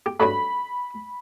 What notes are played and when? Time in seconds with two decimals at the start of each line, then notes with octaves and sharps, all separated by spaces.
0.06 G4
0.20 G2 F#3 A3 B5